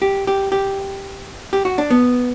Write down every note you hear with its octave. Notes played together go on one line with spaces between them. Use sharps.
G4
G4
G4
G4
F#4
D4
B3